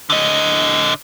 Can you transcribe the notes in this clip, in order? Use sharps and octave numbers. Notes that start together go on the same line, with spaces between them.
D3 D#5